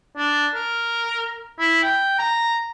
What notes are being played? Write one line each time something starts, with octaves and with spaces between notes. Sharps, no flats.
D4
A#4
E4
G5
A#5